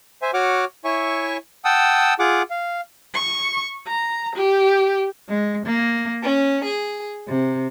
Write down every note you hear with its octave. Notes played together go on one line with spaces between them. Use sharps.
C5 E5 G#5
F#4 C#5 F#5 D6 F6
E4 C#5 E5 G#5 C#6
F#5 G5 A5 D#6 E6
F4 G#4 F#5 D6
F5
C#6
A#5
G4
G#3
A#3
C#4
G#4
C3